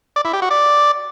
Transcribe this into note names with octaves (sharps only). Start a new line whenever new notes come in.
D5
E4
G4
F#4
D5